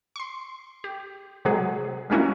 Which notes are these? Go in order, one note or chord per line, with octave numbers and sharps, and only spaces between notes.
C6 C#6
G4
C3 F#3 G#3 G#4
G3 G#3 A#3 C#4 E4 F#4